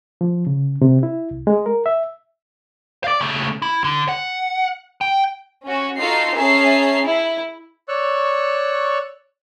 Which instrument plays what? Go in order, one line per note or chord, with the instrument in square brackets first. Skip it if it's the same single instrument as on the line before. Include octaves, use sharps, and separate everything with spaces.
[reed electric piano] F3
C#3
C3
E4
C2
G#3
A#4
E5
[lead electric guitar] D5 F5
C#3 A3
E4
D3
F#5
G5
[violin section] C#4 F#4
D#4 F4 F#4 A4 C7
C#4 G#4 E5 A5 A#5 C7
E4
[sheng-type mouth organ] C#5 D5 C#6 E6 F#6